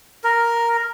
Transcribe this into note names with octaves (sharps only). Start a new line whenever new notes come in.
A#4